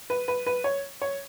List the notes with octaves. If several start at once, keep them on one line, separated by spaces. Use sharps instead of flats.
B4
B4
B4
C#5
C#5